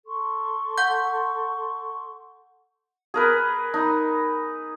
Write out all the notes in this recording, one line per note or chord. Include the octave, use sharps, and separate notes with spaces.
A4 C6 C#6
F#5 G6
G#4 A#4 B4
D#4